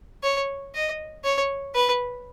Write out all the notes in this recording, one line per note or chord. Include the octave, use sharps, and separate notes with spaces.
C#5
D#5
C#5
B4